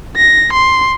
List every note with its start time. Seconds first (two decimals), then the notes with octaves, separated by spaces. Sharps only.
0.17 A#6
0.53 C6